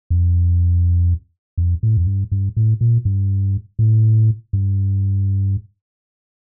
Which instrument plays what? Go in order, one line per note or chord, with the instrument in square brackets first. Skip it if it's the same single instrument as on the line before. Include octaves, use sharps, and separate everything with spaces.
[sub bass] F2
F2
A2
F2
G2
G2
A2
A#2
G2
A2
G2